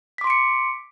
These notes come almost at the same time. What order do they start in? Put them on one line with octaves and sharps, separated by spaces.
B6 D6 C6 D7 C#7